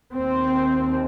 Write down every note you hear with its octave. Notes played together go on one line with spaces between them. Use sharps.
D#2 C4